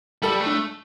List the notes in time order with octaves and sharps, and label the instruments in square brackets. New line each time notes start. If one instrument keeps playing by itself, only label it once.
[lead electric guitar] G3 [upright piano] A4
[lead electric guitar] A3
[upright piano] D4